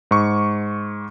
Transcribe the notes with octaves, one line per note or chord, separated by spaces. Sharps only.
G#2 C#6